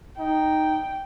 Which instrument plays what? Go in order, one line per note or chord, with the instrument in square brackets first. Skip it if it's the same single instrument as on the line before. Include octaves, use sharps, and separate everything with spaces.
[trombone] D#4 [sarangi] G5